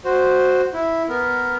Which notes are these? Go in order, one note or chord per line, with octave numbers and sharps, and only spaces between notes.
F#4 C5
E4
B3 A#4